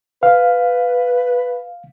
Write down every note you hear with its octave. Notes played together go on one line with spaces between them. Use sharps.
B4 F5